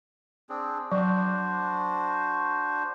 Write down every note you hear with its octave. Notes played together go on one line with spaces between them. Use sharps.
C4 D4 G#4
F#3 D4 F#4 C5